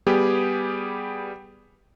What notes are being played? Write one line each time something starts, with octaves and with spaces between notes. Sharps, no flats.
G3 B3 G4 G#4